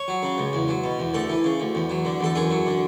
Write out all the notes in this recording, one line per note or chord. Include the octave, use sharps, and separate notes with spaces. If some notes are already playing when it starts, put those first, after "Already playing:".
Already playing: C#5
F#3
C#3
C#2
E2
F#3
B2
E2
D2 A4
E3
C#3
D2
E2
F#3
D3
E2 A4
F#2 G#4
F#3
D3